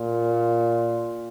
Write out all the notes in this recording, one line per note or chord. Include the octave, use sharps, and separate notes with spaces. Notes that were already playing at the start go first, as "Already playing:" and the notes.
Already playing: A#2